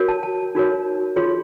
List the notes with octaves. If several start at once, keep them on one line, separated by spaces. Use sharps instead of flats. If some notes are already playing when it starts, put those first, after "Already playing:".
Already playing: F#4 A#4 C#5
A5
A5
D#4 F#4 A#4 C#5
F4 G#4 C#5 C6